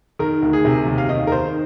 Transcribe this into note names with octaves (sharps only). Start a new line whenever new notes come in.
D#3 A#4
D2
G#4
C3
D#2
F5
D#3 D#5
A#4
D#3 C5